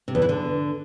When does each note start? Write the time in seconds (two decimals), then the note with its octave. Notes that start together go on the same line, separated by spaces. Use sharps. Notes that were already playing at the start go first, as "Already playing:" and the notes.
0.08 C3
0.15 E2
0.22 E3
0.29 D3